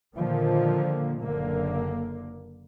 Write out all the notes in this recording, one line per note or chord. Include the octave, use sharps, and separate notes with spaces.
A#2 D3 D#3 F3 A#3
F#1 D3 A#3